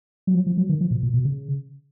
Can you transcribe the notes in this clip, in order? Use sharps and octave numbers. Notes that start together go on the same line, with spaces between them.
F#3
F3
F3
F#3
D#3
F3
A#2
A#2
B2
C#3